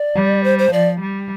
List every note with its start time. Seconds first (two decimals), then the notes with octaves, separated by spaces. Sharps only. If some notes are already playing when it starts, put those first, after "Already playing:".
Already playing: D5
0.15 G3
0.44 C5
0.59 C5
0.73 F3 D5
1.01 G3